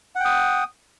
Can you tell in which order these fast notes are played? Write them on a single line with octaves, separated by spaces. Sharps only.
F#5 G5 D#6